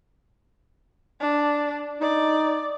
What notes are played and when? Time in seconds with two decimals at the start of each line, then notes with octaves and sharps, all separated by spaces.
1.20 D4
2.01 D#4 D5